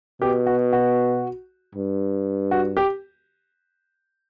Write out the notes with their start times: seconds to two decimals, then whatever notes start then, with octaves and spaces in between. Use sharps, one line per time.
0.21 B2 G4
0.46 F#4
0.73 F#4
1.75 G2
2.51 F#4
2.77 G4